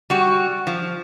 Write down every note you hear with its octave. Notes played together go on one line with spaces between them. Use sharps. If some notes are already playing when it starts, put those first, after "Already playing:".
G3 F#4
F3